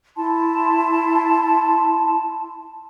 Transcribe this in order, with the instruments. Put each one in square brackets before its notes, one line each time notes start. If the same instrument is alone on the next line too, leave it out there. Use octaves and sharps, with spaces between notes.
[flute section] E4 A5 C6